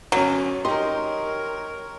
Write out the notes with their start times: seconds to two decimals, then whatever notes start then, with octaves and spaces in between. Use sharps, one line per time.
0.12 G1 F#3 C#4
0.65 D#4 G4 A#4 C#5 D#5 C6